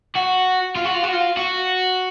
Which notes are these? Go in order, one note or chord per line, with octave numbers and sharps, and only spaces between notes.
F#4
F4
F#4
F4
F#4
F4
F#4